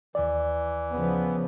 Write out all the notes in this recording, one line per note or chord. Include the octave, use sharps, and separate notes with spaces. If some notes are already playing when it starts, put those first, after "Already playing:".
D#2 E3 D5
C#3 F3 B3